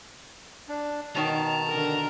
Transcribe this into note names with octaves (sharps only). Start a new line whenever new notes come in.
D4
B2 D#3 A5 A#5
D3 A#4